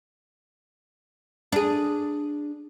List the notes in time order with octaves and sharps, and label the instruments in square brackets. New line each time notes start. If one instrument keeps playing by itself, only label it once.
[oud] D4 G#4